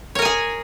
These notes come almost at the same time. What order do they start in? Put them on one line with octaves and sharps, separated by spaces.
C#5 A#4 G#5 G#4